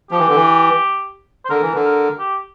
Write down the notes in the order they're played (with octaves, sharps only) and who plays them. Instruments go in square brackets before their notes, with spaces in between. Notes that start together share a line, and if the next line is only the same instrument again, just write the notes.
[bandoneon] F3 [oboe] G4
[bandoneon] E3
D3
E3
[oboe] C5
[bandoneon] D3 [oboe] A#4
[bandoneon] E3
D3
[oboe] A#4
G4